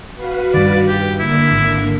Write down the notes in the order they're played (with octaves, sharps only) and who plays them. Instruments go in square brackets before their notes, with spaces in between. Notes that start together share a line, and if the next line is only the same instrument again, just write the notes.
[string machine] F#4 B4 F5
[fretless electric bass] G2 D#3 [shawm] D5
[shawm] G4
[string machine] D3 A#3 [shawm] E4
[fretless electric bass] G#1